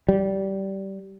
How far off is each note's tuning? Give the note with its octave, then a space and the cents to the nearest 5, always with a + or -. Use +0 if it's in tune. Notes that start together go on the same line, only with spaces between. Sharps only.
G3 -15